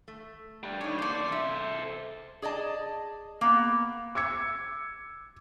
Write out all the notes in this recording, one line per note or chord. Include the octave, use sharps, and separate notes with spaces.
A3
G3 D4
G3 D4 D#4 C#5
A#3 A4 C5 D5
C3 E5
G#4 D5 D#5 A5
A#3 B3
D6 E6 G#6 C#7